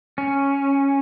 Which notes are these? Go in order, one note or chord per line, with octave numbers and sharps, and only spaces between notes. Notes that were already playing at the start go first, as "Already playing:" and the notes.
C#4